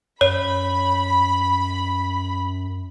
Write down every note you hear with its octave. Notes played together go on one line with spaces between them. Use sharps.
F#2 C#5 B5